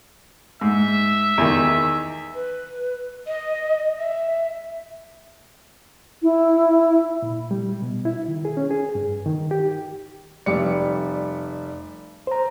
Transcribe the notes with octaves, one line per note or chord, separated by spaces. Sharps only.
G#2 E5
E2 D#3
B4
D#5
E5
E4
A#2
G3
B2
E4
D#3
G#4
C#4
G#4
G2
D#3
G4
F1 G3 D5 C#7
C5 A#5